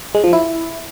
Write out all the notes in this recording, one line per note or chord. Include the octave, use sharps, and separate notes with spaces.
G#3
F3
E4